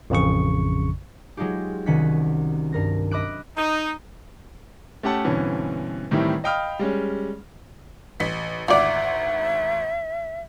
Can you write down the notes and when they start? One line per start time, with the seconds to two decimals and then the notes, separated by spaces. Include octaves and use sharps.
0.10 A1 F2 C#3 C#6
1.37 F#3 G#3 D#4 F4 G4
1.86 C2 D#3 C#4 F#4 B6
2.72 G2 A#4 A#6
3.11 D#5 B5 D6 E6 F#6 D7
3.57 D#4
5.03 A3 C#4 G4 A4 F#5 A5
5.24 G2 B2 D3 E3 C4 C#4
6.11 A2 D#3 E3 G3 C4 E4
6.44 D#5 F5 G5 B5 D#6 F6
6.79 G3 G#3 C#4
8.20 A1 B6
8.68 G#1 D2 F4 D5 E5 F#5